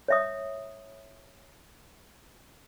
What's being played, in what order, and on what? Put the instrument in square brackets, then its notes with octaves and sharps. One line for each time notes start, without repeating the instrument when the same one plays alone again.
[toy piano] C#5 E5 D#6